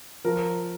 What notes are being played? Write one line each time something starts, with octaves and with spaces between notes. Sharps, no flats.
F3 A#4